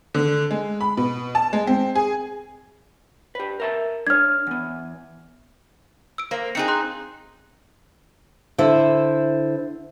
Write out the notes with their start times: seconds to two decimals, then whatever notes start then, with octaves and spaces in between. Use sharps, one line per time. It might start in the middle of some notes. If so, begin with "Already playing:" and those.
0.14 D3
0.51 G#3
0.81 B5
0.97 B2
1.35 A5
1.53 G#3
1.67 C4
1.96 G#4
3.35 G4 B4
3.60 A#4 E5 A5
4.07 D4 C#5 F6 G#6
4.47 E2 B3
6.18 E6 D7
6.31 A#3 C5 F5 A#6
6.55 C4 D#4 G#4 G5 F#6 C#7
6.68 A#5 C6 F#6
8.58 D3 E4 C5 E5